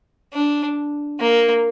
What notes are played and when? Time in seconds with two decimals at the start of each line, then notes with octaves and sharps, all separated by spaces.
0.34 D4
1.20 A#3